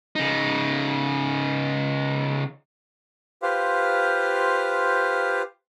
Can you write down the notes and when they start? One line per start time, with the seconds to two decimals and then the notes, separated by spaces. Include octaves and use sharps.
0.15 C#3 D#4
3.42 F4 G4 B4 C5 F5